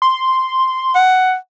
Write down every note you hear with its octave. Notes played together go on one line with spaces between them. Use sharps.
C6
F#5